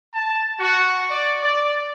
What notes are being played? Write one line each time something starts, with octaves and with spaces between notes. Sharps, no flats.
A5
F#4
D5
D5